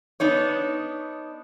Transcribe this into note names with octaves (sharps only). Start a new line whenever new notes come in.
B3 D4 D#4 C#5